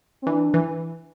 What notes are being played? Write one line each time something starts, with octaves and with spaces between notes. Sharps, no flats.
C4
E3 D4
E3